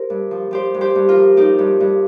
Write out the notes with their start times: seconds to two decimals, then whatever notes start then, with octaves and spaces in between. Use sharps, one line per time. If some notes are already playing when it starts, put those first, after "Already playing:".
Already playing: G4 A#4 C5
0.10 G2
0.31 F3
0.51 F3 G4 C5
0.74 G2
0.81 G4 C5
0.95 G2
1.09 F4 A#4
1.16 F3
1.37 F3 D#4 G4
1.59 G2
1.80 G2